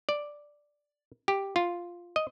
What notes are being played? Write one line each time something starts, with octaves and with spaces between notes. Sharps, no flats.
D5
G4
F4
D#5